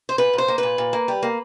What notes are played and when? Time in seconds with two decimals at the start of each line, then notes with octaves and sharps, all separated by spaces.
0.09 C5
0.18 A#2 B4
0.33 A#2 C5
0.48 A#3
0.58 A#2 B4
0.78 A#2
0.93 A#3
1.08 G3
1.23 A#3